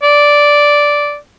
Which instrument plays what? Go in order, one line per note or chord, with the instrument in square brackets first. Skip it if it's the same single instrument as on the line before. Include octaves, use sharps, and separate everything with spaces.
[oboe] D5